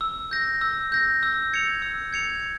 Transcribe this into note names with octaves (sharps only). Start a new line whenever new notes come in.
E6
G6 A#6
E6
G6 A#6
E6
G#6 C#7 F7
E6
G#6 C#7 F7